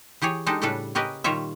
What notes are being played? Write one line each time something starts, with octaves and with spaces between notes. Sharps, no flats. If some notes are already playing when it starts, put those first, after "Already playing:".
E3 G4 G#4 C#5
G#3 D4 D#4 G4 A4
A2 C#3 G3 D4 A4 B4
C#4 G4 A#4 B4 D#5
A#2 D#3 G3 F4 C#5 E5